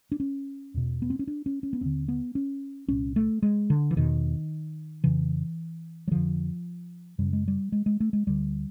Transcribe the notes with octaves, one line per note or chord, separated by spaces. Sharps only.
D4
C#4
E2 B2
B3
C4
C#4
D4
C#4
C#4
B3
D#2 D3 C4
B3
C#4
C2 A#2 C#4
A3
G#3
D3
E3
E2 B2 D#3
F2 C#3 E3
F#3
F2 D3 F3
F#2 C#3 G3
G#3
G3
G#3
G#3
A3
G#3
D2 D3 G3